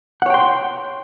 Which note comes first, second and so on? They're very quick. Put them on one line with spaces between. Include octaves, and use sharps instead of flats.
F#5 C#5 G5 C6